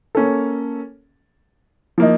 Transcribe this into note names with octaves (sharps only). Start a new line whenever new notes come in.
A#3 C#4 A4
F3 A#3 D#4